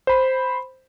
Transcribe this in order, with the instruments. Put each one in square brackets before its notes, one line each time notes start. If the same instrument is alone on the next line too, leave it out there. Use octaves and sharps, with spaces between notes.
[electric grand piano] C5 B5